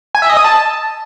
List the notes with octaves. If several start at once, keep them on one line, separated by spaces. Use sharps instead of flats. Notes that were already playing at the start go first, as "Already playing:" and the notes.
G#5
E5
D#5
D#6
A5